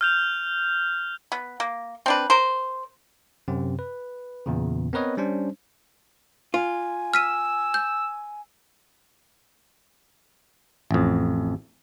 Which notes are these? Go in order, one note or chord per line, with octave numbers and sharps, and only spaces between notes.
F6 G6 F7
B3
A#3
C4 D4 B4
A#4 C5
F#2 C3 C4
B4
E2 A#2 C#3
B3 C4 A#4 B4 C#5 D#5
G3 C#4 D4 C5
F4 G#5
E6 F6 B6 D#7
G6
A1 F2